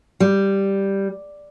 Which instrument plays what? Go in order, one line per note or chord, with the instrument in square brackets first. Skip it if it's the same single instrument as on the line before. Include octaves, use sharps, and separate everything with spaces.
[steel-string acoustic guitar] G3